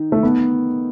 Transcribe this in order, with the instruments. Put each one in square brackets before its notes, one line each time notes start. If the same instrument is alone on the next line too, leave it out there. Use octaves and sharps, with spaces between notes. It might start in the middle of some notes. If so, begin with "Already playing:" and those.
Already playing: [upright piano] D#3 D#4
[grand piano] A3
B3